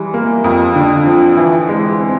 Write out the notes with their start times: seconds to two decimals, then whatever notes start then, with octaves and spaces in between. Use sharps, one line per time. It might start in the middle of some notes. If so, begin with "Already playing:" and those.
Already playing: E3 G3 G#3
0.14 A#3
0.44 F2
0.76 D3
1.07 F3
1.37 E3
1.69 G#3
2.00 C4